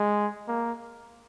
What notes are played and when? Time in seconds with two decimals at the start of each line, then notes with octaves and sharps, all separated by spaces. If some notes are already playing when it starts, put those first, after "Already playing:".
Already playing: G#3
0.48 A#3